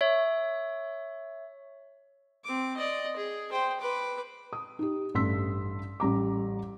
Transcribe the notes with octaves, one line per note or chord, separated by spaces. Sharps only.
C#5 E5
C4 D6
D5 D#5
G#4
C5 G5
B4 D6
D#6
D#4 G4
A1 G2 A3 C6 E6 B6
A1 G3 A#5 D6